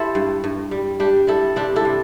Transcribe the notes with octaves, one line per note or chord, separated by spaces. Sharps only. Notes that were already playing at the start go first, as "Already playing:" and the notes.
Already playing: E4 G4 A4 C5
G2
G2
G3
G3 D4 G4
G3 E4 A4
C3 D4 G4
E4 A4
C3